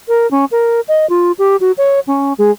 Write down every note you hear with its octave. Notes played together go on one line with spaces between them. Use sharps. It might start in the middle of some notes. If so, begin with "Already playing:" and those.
A#4
C#4
A#4
D#5
F4
G4
F#4
C#5
C#4
G#3